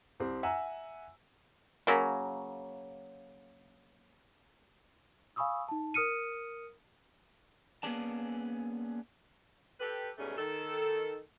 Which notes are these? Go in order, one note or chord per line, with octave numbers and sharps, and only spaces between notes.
C2 C4 G4
E5 F#5 G#5 A#5 E6
C#3 F#3 A#3
F5 G#5 B5 C#6 D#6 E6
D#4 A5
A#4 D#6 F6 C#7 D#7
A#3 B3 C#4 G#4 D5 A5
G4 A4 B4
G#2 B2 G3 A3 C#4 G#4
D#3 A4